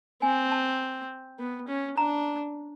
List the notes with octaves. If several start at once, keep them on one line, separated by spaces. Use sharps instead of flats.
C4 G#5
A5
B3
C#4
D4 A#5